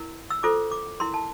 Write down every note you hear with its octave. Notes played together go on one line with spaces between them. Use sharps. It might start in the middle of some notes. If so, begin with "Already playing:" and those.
Already playing: E4 A#4
E6
F4 A4 C5 D6
D6
E4 A#4 C6
A5